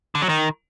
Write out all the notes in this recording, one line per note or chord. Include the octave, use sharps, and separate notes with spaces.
D3
F#3
D#3